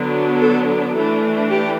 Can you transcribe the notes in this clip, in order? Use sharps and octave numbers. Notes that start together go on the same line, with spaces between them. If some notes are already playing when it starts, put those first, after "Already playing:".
Already playing: D3 F#3 B3 D4
A4
E3 A3 D4 A4
G4